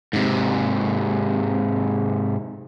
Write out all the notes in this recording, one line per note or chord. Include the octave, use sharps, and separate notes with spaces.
G#2 C3